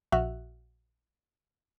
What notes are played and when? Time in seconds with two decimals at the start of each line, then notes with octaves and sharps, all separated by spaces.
0.12 A#1 F#4 E5 F6 F#6